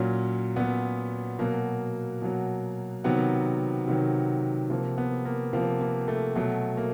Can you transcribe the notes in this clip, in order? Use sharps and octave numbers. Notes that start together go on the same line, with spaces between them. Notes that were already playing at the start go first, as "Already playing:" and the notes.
Already playing: A#2 F#3 C#4
A#2 F#3 B3
B2 F#3 A#3
B2 F#3
C3 D#3 F#3 B3
C3 D#3 F#3
C3 F3 A#3
B3
A#3
C3 F3 A#3
A#3
A3
B2 F#3 A3
A#3